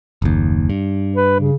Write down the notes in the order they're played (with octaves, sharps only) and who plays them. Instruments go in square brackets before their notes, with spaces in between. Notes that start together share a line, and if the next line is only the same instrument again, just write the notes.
[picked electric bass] F#1 D#2
G2
[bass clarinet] B4
C#3